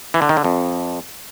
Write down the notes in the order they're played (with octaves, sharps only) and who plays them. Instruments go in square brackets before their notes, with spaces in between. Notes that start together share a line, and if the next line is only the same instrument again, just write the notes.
[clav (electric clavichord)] E3
D3
D#3
D3
F2